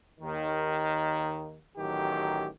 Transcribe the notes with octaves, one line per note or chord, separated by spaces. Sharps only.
D#2 D#3
A1 D#3 F#3 G4